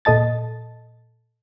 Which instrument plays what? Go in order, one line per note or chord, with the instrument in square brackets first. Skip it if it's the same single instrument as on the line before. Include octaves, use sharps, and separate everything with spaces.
[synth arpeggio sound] A#2 A4 D#5 A5 A6